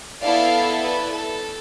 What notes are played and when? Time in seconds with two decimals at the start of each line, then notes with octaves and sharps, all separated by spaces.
0.23 B3 E4 A4 D5 F5
0.83 B4 D5
1.14 A4